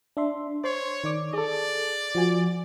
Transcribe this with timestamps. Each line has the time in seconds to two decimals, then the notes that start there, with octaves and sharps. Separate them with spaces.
0.17 D4 E5 C6
0.64 C5 C#5 C6
1.04 D#3 D5 D6
1.33 G#4 A4 D5
2.15 F3 F#4 G#5